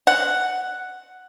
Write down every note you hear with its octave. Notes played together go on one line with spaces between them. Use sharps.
F#5